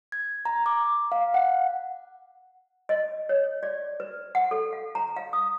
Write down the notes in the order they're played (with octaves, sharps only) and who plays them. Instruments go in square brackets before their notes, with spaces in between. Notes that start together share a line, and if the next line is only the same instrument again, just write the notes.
[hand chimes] G#6
A#5
D6
F5
F#5
[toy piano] D#5
C#5
D5
B4
F#5
A4
F5
A#5
F5
D#6